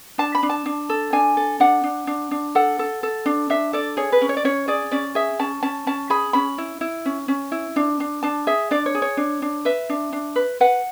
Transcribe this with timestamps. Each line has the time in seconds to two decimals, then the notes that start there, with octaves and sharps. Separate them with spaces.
0.18 D4 A5
0.35 B5
0.43 D4
0.50 A5
0.66 D4
0.89 A4
1.13 D4 G#5
1.37 A4
1.60 D4 F#5
1.84 D4
2.07 D4
2.31 D4
2.55 A4 F#5
2.79 A4
3.03 A4
3.26 D4
3.50 D4 E5
3.73 A4 D5
3.97 G#4 C#5
4.12 B4
4.21 C#4
4.29 C#5
4.37 D5
4.45 C#4 C#5
4.68 G#4 D5
4.91 C#4 D5
5.15 G#4 E5
5.39 C#4 A5
5.63 C#4 A5
5.87 C#4 A5
6.10 G#4 B5
6.33 C#4 B5
6.58 E4
6.81 E4
7.05 C#4
7.28 C#4
7.52 E4
7.76 D4
8.00 D4
8.23 D4 A5
8.47 G#4 E5
8.71 D4 D5
8.86 C#5
8.95 G#4
9.02 C#5
9.17 D4
9.42 D4
9.65 B4 E5
9.89 D4
10.13 D4
10.36 B4
10.60 B4 F#5